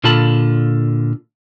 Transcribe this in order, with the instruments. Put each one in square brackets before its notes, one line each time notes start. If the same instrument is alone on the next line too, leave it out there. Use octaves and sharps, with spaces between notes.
[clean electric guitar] A#2 D3 F4 A4 A5 B5